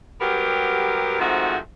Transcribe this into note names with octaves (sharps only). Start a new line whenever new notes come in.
F#3 G3 B3 G4 A#4
G#2 D#3 F3 A3 C4 F#4